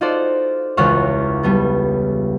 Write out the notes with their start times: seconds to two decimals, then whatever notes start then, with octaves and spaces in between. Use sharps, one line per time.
0.01 D#4 F4 F#4 A4 C5 D5
0.77 E1 C#2 G#3 F4 F#4 C#5
1.43 G3 B3 A4